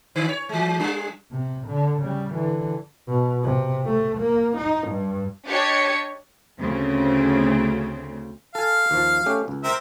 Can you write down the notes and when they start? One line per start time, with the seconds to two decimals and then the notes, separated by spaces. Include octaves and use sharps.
0.16 D3
0.29 C#5
0.49 E3 G#3
0.80 G3 D4
1.32 C3
1.68 D3
2.02 C#3 G3
2.33 D3 E3
3.07 B2
3.43 C3
3.85 A3
4.18 A#3
4.57 D#4
4.88 G2
5.48 D4 G4 C#5 D#5 G#6 C#7
6.59 D2 C#3 C4
8.55 A4 F5 G#5
8.91 D#2 F3
9.26 A3 C#4 G4
9.48 C#2
9.64 C4 A#4 E5